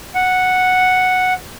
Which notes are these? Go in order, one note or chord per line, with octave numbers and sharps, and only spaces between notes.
F#5